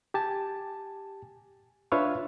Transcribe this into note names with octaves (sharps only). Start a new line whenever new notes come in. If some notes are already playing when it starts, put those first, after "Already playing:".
G4 G#5 A5
D4 F4 B4 C#5 E5 F5